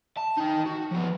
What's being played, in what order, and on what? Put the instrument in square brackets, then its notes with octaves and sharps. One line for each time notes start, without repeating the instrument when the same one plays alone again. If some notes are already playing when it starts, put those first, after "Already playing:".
[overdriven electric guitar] A5
D#4 G5
F#4
F3 B3